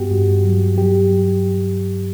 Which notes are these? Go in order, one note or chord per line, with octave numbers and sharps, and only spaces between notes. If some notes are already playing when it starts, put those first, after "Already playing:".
Already playing: G2 B3 F#4 G4
G2
F#3
F#3 G4